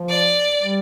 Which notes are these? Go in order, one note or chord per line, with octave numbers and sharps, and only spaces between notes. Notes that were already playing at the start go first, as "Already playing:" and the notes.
Already playing: F3
D5
G3